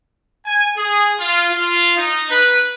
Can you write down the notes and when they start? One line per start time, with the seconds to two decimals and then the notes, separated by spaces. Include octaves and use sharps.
0.46 G#5
0.76 G#4
1.19 F4
1.52 F4
1.97 D#4
2.30 B4